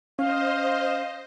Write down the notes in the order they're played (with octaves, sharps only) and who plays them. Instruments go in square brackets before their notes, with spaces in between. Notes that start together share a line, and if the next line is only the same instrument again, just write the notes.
[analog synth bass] C#4 [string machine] C5 D#5 [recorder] F5